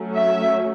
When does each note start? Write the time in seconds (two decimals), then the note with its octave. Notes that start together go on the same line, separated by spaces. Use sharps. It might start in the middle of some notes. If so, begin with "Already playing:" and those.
Already playing: F#3 A3 C#4
0.15 E5